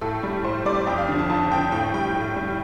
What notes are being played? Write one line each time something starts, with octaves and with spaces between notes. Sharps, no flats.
A2 A4
G3
A2 C5
G3 D5
F2 G5
F5
D3 F3
A5
F2 A5
D3 F3 G5
A2 G5
G3 G5
A2
G3